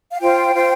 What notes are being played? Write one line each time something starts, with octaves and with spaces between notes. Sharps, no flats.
F5
F4 C5 G5
F4 C5